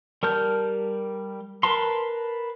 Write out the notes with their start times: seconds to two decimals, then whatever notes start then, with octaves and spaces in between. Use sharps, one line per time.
0.23 G3 A#4 A5 F6 G6
1.63 A#4 B4 A5 A#5 C6